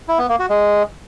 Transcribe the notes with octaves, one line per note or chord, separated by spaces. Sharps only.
E4
B3
A#3
F#4
G#3